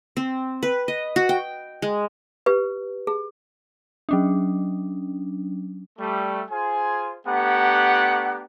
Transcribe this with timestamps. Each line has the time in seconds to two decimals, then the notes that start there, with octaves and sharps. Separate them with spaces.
0.17 C4
0.63 B4
0.88 D#5
1.16 F#4
1.29 G5
1.82 G#3
2.46 G4 B4
3.07 G#4
4.09 F#3 C#4 D4
5.99 G3 A3
6.49 F4 G#4 C5 G#5
7.26 A3 B3 D4 G4 F#5 A#5